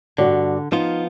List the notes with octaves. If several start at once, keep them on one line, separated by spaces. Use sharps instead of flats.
G2 D3 F#4 D5
F3 B3 D#4 F4